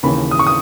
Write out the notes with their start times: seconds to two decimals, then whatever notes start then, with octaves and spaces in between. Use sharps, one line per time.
0.03 D#2 C#3 E3 B5
0.31 D#6
0.39 C#6
0.47 D#6